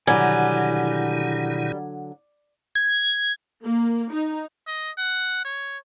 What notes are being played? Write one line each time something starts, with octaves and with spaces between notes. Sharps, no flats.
B2 D3 D#3 F#3 G3 E4 F#5 G#5
G#6
A#3
D#4
D#5
F#5
C#5